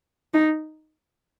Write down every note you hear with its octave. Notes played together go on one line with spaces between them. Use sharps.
D#4